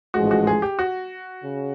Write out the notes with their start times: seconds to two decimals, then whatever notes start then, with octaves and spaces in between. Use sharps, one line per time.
0.14 A1 G#2 F3 G#3 F#4
0.31 F#4
0.47 G#4
0.62 G4
0.79 F#4
1.43 C#3